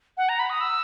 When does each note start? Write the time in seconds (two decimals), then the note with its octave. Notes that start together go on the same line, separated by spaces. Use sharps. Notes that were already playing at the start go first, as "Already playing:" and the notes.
0.17 F#5
0.29 A#5
0.39 B5
0.50 D#6
0.61 E6